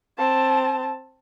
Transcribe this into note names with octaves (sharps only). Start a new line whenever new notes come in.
C4 A5